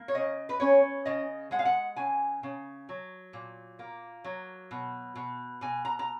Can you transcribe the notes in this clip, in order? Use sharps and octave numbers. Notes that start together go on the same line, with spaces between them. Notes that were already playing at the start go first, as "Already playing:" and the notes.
Already playing: A#3
C#5
C#3 D#5
B4
C#4 C#5
C#3 D#5
G#3 F#5
F5
F#5
C#3 G#5
C#3
F#3
A#2
A#3
F#3
B2
B2
B2 G#5
A#5
A#5